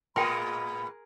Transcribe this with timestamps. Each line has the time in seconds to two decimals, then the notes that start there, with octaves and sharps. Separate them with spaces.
0.16 A2 G#3 B3 G#4 A#4 G5 B5 C6